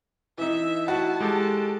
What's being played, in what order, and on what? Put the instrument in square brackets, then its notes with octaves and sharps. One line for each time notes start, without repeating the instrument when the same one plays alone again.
[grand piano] E3 D#4 [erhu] E5
[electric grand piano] E4 [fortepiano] F#4 [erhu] A5
[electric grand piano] G#3 G4 A4